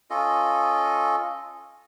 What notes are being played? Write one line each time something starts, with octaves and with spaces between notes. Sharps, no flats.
C#4 F4 A4 D#5